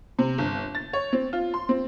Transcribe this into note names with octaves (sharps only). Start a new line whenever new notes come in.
C3
G1
A6
C#5
C4
F4
C6
C4